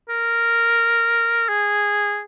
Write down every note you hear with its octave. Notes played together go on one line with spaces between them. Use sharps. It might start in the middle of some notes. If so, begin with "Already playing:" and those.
A#4
G#4